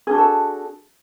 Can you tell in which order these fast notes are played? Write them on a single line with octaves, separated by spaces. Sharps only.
G#4 D4 F#4 A4